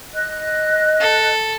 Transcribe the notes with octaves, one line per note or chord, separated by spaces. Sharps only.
D#5 F#6
A4